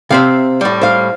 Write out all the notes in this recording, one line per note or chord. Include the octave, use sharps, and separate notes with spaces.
C3 C4 E5 F5
A2 G3
C5 F5